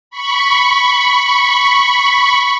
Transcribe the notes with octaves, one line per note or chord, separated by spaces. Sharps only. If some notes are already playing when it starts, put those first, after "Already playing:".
B5 C#6